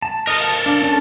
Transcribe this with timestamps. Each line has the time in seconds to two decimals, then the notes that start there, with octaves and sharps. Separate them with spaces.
0.02 A5
0.27 A4 A#4 D#5
0.40 F5 A5
0.66 D4
0.82 C#4 D4